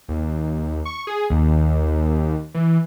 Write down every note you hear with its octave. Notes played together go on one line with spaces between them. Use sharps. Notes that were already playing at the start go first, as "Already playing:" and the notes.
D#2
C#6
G#4
D#2
E3